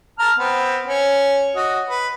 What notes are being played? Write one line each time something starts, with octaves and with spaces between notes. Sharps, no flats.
A5 A#5 F6
B3 C4 C5
C#4
F#4 D#5
B4